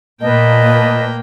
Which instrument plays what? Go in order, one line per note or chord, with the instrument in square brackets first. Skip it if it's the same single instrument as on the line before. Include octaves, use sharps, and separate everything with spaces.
[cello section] A#2 [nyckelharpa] A#3 G5 [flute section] B4 D#5 A5